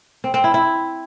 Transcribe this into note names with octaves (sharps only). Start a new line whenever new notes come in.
C4
C4
E4
E4